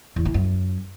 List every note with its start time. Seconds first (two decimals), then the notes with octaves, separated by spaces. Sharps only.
0.16 E2
0.25 E3
0.34 F#2